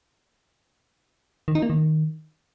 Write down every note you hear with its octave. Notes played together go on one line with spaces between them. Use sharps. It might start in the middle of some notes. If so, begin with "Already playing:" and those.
D#3
D#4
A#3
D#3